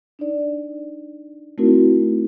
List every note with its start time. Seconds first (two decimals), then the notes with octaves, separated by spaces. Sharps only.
0.19 D4 D#4 D5
1.58 A3 C4 D#4 E4 F#4 A#4